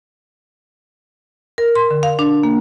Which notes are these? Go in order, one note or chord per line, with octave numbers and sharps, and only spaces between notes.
A#4
C6
D3
F5
D4
A#3